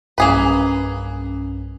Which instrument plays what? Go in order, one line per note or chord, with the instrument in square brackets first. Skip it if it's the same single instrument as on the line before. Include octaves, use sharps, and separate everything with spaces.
[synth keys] B1 G2 C#4 [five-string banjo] A#3 G#4 B4